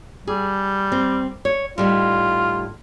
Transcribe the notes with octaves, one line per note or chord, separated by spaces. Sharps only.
G3 G#4
C4
C#5
A2 G3 D#4 F4